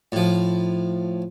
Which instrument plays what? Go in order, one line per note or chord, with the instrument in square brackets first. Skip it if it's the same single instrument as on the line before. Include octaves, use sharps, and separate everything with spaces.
[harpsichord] A2 F3